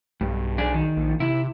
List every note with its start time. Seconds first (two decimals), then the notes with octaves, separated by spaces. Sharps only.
0.21 B1 G2
0.58 D4 G#4
0.74 D#3
0.97 A#1
1.20 C3 E4